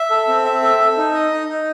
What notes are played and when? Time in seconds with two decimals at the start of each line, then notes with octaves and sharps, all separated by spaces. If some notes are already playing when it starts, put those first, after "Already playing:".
Already playing: E5
0.11 A4
0.28 C4
0.45 E5
0.62 A4
0.80 A4
0.98 D#4
1.14 D#5
1.32 D#4
1.49 D#4